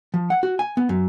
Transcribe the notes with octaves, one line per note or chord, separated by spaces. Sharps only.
F3
F#5
F#4
G#5
B3
F#2